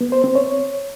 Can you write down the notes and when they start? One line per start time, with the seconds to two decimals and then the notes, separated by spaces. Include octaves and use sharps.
0.01 B3
0.12 C5
0.24 C4
0.35 C#5